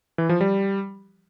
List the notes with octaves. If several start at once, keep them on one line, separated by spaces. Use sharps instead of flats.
E3
F3
G3